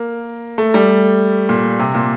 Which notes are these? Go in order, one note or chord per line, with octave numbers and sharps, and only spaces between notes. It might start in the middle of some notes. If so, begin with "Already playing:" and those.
Already playing: A#3
A3
G3
A#2
C3
A#2